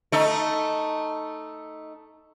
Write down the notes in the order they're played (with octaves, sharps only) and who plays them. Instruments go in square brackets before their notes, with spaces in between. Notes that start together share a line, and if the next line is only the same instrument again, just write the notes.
[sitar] A3 D#4